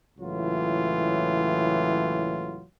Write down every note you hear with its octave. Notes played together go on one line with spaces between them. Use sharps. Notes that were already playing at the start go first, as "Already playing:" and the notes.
C#2 A2 E3 F#3 F4